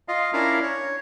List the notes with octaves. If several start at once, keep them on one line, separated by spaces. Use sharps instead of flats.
F4 D#5 F5
C#4 D4 E4 A#4 F5 A#5
C#5